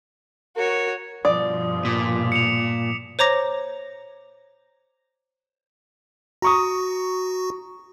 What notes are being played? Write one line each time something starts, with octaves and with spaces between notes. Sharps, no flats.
F#4 A#4 C#5
G2 B2 F3 D5 D#6
A#2 D6 D#6 B6
C#7 E7 F7
C5 C#5 A#5 D6 A#6
F#4 A#5 C#6 D#6